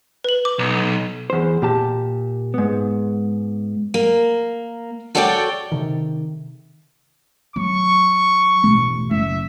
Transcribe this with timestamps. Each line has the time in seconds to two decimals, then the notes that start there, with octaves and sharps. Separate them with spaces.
0.24 B4 F#7
0.45 D6
0.59 B1
1.30 E2 C5
1.62 A#2 G4 A5
2.54 G#2 B3
3.94 A#3
5.15 F#4 A4 C#5 D5 F#5 G5
5.72 C3 D#3
7.56 F#3 C#6
8.64 E1 A1
9.11 F#1 E5